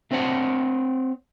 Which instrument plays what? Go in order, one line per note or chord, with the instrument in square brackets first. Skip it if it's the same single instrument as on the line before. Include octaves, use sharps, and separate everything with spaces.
[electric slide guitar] A3 C4 C5 C#5 F#5 A5